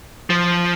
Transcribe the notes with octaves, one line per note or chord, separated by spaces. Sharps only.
F3